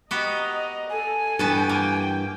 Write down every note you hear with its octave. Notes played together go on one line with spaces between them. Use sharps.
B3 F#4 G4 D#5 A#5
A4 G#5
G2 E3 B3 F#4 G5 A5
A#3